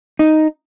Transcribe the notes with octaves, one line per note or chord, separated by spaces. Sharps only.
D#4